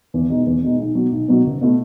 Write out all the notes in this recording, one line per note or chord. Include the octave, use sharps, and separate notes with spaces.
E2
B2 G#3 D#4
E2
B2 G#3 D#4
B1
B2 F#3
B1
B2 F#3
F#1
B2 A3 E4